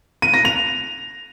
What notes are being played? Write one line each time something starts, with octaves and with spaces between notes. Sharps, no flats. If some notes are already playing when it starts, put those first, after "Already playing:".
D#7
A#6
F7